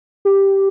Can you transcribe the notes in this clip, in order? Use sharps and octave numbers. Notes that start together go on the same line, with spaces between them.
G4